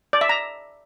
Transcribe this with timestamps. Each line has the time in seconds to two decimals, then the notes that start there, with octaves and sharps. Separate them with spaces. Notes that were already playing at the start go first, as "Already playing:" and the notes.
0.13 D5
0.21 E5
0.29 A#5